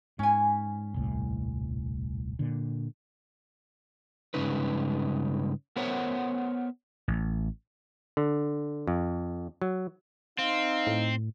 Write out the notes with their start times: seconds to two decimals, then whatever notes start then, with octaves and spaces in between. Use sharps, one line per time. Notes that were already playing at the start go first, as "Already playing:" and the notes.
0.19 G#2 C#4 G#5
0.94 D#1 C2 A2
2.39 A#2 D3
4.34 G2 C#3 G#3 C#4 D#4 B4
5.76 B3 A#4 C5 C#5 E5 F#5
7.08 A1
8.17 D3
8.87 F2
9.62 F#3
10.39 C4 D#4 F5
10.87 A2